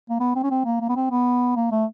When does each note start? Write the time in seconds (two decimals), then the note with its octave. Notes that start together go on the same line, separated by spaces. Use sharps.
0.10 A#3
0.20 B3
0.36 C4
0.43 C#4
0.51 C4
0.65 A#3
0.80 A#3
0.89 B3
0.96 C4
1.11 B3
1.56 A#3
1.72 A3